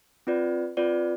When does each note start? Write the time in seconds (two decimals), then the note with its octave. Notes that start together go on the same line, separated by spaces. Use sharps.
0.27 C4 F4 B4 D5
0.77 C4 F4 B4 D5